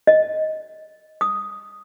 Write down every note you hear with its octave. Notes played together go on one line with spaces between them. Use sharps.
D#5
D#6